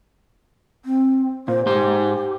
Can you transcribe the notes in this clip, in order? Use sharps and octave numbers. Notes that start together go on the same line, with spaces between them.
C4
A#2 C5
G#2 G4 C5